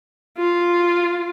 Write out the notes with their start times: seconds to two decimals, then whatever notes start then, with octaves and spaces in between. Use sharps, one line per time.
0.38 F4